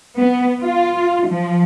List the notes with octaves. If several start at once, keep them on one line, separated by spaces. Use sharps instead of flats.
B3
F4
F3